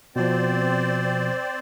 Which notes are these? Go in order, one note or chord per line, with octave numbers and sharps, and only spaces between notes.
B2 F3 C4 C5 D5